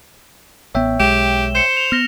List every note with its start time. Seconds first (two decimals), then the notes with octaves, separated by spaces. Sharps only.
0.75 A1 B3 C#5 E5 G5
1.00 B1 G#3 G4 E7 G7
1.55 C5 C#7 E7
1.77 F7
1.92 B3 F6 A#6